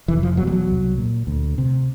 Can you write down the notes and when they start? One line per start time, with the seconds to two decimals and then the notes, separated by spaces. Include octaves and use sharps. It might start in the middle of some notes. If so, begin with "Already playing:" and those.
0.08 F1 E3
0.23 F3
0.37 E2 B2 F#3
0.47 G3
0.52 F#3
0.68 C2
0.98 A#2
1.27 D2
1.58 C3